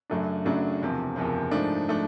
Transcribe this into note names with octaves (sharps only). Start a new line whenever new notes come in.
F#2 C#3 F#3 A3 D4
F#2 C#3 F#3 A3 D4
F#1 E2 C3 F3
F#1 E2 C3 F3
G#2 F3 A3 D4
F3 A3 D4